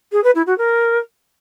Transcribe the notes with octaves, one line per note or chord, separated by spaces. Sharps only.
G#4
B4
E4
F#4
A#4